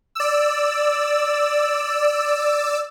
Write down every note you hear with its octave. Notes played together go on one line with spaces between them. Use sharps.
D5 E6